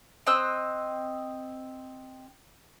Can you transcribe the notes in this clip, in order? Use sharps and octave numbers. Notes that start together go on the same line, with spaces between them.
C4 D#5 E6 F#6